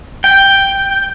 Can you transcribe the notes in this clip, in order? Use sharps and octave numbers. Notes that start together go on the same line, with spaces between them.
G5